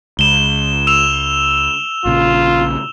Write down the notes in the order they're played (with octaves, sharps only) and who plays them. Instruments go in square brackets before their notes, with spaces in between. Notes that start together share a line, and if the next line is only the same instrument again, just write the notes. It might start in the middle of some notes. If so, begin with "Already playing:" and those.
[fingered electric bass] C#2 [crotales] E7 G7
[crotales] E6 E7 F7
[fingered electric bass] A#1 A#2 C#3 [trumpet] F4